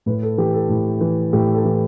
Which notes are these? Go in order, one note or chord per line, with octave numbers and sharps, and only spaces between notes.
A2 B4
A4
E3 G4
A4
A2
E3
A2 G4
A4
E3